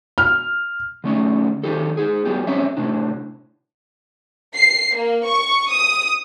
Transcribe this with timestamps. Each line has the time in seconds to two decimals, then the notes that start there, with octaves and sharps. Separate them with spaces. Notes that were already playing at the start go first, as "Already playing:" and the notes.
0.18 F6
1.04 D3 A3 C#4 D#4
1.63 D#3 D#4 G4 A4
1.97 D#4 G#4
2.25 F#3 G3 B3 G4
2.47 C4 C#4 C#5 D#5 E5
2.77 A2 C3 D4
4.55 C7
4.96 A#3
5.27 C#6
5.72 D#6